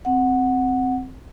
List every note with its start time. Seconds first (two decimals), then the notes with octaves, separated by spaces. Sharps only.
0.05 C4 F#5